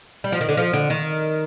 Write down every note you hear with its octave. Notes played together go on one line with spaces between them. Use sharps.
G3
F3
D#3
D3
F3
D3
D#3